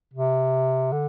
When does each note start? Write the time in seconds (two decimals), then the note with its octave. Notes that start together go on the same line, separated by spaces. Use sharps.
0.13 C3
0.92 D3